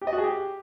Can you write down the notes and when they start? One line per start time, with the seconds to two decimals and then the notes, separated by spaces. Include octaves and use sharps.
0.02 G4
0.07 D#5
0.13 F#4
0.18 G#4
0.24 G4